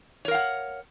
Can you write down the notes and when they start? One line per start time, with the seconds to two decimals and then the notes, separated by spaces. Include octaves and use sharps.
0.25 C#5
0.28 A#4
0.31 F5
0.34 F#5